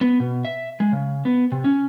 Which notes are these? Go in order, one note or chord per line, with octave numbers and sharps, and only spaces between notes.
B3
B2
E5
G#3
C#3
B3
C3
C#4